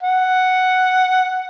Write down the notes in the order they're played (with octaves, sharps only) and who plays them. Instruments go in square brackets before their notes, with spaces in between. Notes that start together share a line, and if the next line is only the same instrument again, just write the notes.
[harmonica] F#5